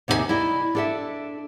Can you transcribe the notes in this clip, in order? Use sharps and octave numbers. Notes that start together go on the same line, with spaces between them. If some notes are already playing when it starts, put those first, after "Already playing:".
D#2 C3 D#4 F#4 G#5
E4 D5 D#5
D4 A4 E5